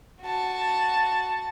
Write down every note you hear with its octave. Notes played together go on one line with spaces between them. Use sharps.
F#4 A5